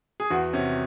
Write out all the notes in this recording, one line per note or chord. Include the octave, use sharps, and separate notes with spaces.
G#4
E2 F#4
C3 C#4